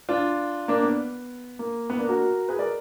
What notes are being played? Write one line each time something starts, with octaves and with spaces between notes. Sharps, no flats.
D4 F4
A#3 D4
B3
A#3
B3
A#3 D4
F#4 A#4
G#4 B4
A#4 D5